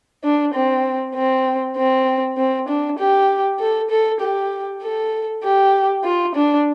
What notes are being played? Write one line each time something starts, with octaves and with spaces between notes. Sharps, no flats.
D4
C4
C4
C4
C4
D4
G4
A4
A4
G4
A4
G4
F4
D4